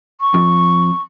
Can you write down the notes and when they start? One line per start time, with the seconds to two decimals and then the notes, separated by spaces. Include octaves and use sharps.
0.21 C#6
0.34 F2